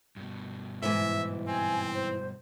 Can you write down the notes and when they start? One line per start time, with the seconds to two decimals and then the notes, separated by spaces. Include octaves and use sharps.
0.16 G2 B2
0.83 G#2 E3 E5
1.47 C4 G#5
1.94 C5